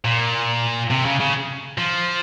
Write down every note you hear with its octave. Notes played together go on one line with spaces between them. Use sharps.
A#2
C3
C#3
C#3
F3